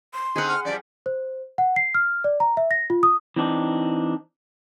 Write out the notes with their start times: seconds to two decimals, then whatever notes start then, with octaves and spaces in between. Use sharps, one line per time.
0.14 C6
0.36 D3 C4 D#4 G#4 F#5
0.48 F6
0.65 F#2 F3 G3 D5
1.06 C5
1.58 F#5
1.76 C7
1.95 F6
2.24 D5
2.40 A#5
2.57 E5
2.71 A#6
2.90 F4
3.03 D#6
3.36 E3 C4 D4 D#4